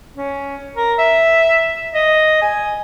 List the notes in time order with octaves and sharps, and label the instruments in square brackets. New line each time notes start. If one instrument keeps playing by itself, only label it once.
[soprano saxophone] C#4
A#4
E5
D#5
G#5